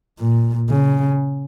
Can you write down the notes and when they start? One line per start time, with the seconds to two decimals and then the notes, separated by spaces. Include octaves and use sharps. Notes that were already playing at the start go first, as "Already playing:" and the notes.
0.20 A#2
0.70 C#3